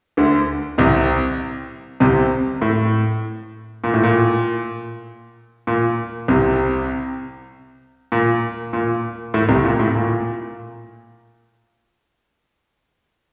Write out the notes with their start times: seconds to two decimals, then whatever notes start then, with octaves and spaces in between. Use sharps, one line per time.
0.17 D2 D3
0.78 C2 C3
2.00 C2 C3
2.62 A2
3.84 A#2
3.94 A2
4.03 A#2
5.67 A#2
6.28 C2 C3
8.12 A#2
8.73 A#2
9.34 A2
9.49 C2 C3
9.65 A#2
9.79 A2
9.95 A#2